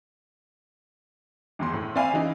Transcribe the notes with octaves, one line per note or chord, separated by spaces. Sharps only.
G#1 E2 C6
A2
C4 D5 E5 F5 G#5 B5
C#3 E3 D#4